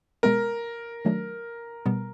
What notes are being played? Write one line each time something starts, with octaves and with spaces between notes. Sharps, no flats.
B2 G#3 B3 A#4
D#3 F#3 A3 D4
B2 G3 B3